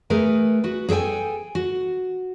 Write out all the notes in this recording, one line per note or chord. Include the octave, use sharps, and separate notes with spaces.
A3 G#4 A#4 B4 G#5
F#4 B4
G#4 A4 C5 G5 G#5
F#4